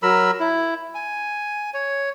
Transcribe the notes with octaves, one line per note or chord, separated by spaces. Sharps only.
F#3 A#4 B5 E6
E4
G#5
C#5